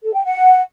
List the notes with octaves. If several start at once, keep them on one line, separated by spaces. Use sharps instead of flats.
A4
G5
F#5